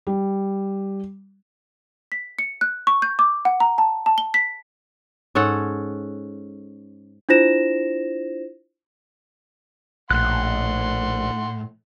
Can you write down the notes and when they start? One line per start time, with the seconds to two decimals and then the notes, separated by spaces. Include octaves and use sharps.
0.07 G3
2.12 B6
2.39 C#7
2.61 F#6
2.87 C#6
3.02 G6
3.19 D6
3.45 F#5
3.60 A#5
3.78 A5
4.06 A5
4.18 G7
4.34 B6
5.35 G#2 C#4 A4 F#5
7.29 D4 E4 F4 C5 A#6 E7
10.10 A#1 A2 F#5 C6 F#6